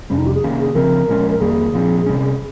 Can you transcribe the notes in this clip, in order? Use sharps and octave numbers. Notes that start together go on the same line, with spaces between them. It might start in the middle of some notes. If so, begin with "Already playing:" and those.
F2 C3 G3 C#4
D#4
G4
G#4
C3 D#3 A#3 C#4
G#4
C#3 F3 C4 A#4
A#2 F3 G#3 C#4
A#4
F2 D#3 G3 A#3 G#4
A#2 F3 C4
C3 G3 C#4